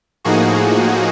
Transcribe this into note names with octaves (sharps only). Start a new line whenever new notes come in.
A2 F3 A#3 D#4 F#4 G#4